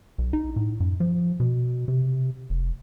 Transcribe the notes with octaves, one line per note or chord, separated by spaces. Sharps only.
B1
D#4
A2
F#2
F3
B2
C3
F1